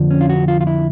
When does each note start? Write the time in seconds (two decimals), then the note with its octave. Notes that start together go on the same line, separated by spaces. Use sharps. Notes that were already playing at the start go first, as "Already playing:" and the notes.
Already playing: F2 D3 F3
0.11 C#4
0.21 F4
0.29 F#4
0.48 F4
0.61 F4
0.67 E4